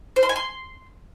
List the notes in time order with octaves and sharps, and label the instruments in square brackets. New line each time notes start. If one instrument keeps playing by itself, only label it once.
[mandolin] C5
C6
G#5
C6